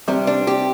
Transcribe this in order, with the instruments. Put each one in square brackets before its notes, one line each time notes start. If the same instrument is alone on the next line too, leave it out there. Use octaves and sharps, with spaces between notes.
[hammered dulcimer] C3 [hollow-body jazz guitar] G3
[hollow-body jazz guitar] D4
G4